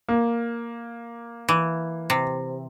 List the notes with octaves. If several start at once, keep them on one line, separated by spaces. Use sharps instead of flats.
A#3
E3
C3